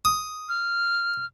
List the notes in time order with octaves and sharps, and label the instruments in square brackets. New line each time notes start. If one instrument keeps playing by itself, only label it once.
[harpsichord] D#6
[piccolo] F6